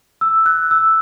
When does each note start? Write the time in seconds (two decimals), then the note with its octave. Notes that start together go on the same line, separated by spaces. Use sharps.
0.21 E6
0.46 F#6
0.71 E6